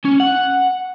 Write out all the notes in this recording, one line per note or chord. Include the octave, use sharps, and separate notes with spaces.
C#4
F#5